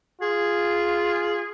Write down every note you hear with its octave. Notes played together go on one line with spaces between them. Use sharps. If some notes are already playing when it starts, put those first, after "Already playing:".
F4 G#4